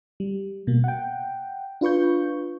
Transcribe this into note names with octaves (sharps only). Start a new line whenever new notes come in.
G3
B2 A#3
F#5 G5
D4 F4 B4 C#6 G6